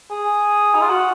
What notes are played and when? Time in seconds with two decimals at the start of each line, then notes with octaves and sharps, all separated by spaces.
0.11 G#4
0.75 D#4
0.81 F4
0.89 F#4